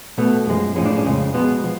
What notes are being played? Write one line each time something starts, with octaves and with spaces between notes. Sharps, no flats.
B2 A3 B3
F#2 F3 G#3
A2 F3 G#3 C#4
D4
C#4
F2 C#3 F3 G#3
B2 G#3 B3
F3